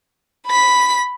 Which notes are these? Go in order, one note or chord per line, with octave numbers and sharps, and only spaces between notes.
B5 B6